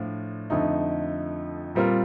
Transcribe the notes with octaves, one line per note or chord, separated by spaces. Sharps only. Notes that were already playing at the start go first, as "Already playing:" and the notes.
Already playing: A2 F3 D4
F2 D3 A3 D#4
A#2 G3 C4 F4 A#4